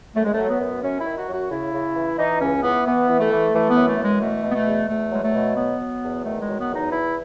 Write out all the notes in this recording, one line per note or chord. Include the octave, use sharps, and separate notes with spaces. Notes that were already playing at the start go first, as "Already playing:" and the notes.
F#2 A3
G#3
A3
F#3
B3
F#2
F#2 C#4
D#3 E4
F#4
F#2 F#4
C#3 E4
C#3
E3
E3 D#4
C#2 C#4
E3 B3
E3 B3
E3
A3
E3
E3 A3
B3
F#2
A3
E3 G#3
B2 A3
B2
B3
A3
E2
E2 A3
F#3 G#3
A3
B2
F#3 B3
F#3
E2
D#3 A3
G#3
F#3
B3
E2 D#4
E3 E4